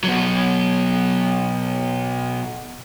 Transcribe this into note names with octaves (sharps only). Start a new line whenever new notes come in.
B2 F#3